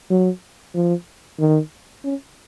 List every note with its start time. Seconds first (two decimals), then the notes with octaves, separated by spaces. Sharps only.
0.10 F#3
0.75 F3
1.39 D#3
2.04 C#4